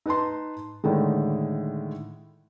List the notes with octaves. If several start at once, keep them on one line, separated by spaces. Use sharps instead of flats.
D#4 B4 A5 C6
A2 D3 D#3 G#3